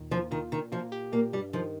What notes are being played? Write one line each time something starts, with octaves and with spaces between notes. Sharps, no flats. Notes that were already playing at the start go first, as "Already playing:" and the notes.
Already playing: D#2 A#2 D#3
F3 A#3
D#3 F4
A#2 D#3
F3 A#3
G4
A#2 A#3
G2 G3
D#3 F3